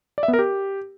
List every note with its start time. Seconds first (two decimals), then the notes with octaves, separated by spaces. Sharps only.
0.18 D5
0.23 E5
0.28 B3
0.33 A#4
0.39 G4